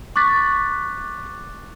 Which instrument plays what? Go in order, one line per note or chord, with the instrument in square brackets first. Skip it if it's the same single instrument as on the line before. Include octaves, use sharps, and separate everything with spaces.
[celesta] C#6 D6 F#6 A6 B6